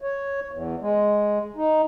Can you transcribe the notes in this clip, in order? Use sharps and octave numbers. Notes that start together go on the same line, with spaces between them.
C#5
E2
G#3
D#4